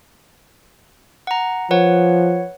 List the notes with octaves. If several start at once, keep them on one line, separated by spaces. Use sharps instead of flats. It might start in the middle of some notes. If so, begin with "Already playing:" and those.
F#5 A#5
F3 B4 C#5 F#5